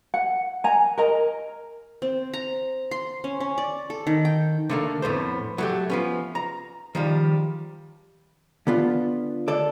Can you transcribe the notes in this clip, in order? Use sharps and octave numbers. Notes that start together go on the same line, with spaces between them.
F#5
G#5 A#5
A#4 D#5 A#5
C4
A#5
C6
C#4
C#4
D5
A4
D#3
G5
D3 A3 A#3
F2 A2 B3 C5
F#3 A3 G4
F3 B3 C#4
A#5
D#3 F3 G3
D3 B3 F4
A4 D5